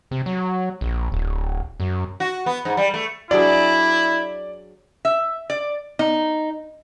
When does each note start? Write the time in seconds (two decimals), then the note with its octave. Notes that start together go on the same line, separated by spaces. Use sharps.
0.11 C3
0.26 F#3
0.81 A#1
1.12 D1
1.80 F#2
2.20 F#4
2.46 B3
2.65 G#2
2.77 G3
2.94 A3
3.31 F#3 D4 E4 G#4 D5
5.05 E5
5.50 D5
5.99 D#4